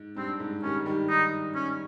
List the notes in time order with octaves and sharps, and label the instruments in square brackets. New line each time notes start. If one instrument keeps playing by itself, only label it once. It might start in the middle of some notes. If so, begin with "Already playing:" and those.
Already playing: [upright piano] G#2
[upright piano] G2 [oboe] C4
[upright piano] G#2
[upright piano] D#3 G3 [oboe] C#4
[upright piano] D#3 G3
[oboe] D#4
C#4